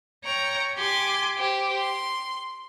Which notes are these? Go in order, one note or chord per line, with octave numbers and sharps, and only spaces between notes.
C#5 G5 A#5 C#6
G4 G#5 C6 D6
G4 C5
C6